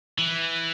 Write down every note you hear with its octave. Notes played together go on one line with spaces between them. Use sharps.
E3